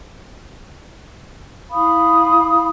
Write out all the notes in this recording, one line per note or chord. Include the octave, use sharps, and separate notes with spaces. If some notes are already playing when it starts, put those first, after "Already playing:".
E4 F5 B5 D#6